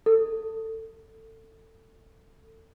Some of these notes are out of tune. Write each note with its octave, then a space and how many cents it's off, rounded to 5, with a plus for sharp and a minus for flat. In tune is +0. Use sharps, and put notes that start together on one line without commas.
A4 +20